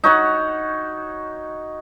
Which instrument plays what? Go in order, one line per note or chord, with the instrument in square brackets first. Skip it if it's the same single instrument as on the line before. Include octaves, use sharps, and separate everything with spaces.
[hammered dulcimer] D#4 F#4 C#5 F#5